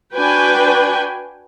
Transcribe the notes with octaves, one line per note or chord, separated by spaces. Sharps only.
D4 F#4 B4 G5 G#5